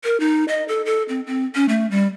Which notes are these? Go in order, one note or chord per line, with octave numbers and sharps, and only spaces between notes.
A#4
D#4
D#5
A4
A4
C4
C4
C#4
A3
G3